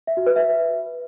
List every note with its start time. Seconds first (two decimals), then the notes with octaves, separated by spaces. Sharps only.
0.07 E5
0.17 F#4
0.26 B4
0.36 E5